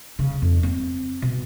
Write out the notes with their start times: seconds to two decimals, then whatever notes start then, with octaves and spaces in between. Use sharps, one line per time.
0.19 C#3
0.42 F2
0.63 C4
1.22 B2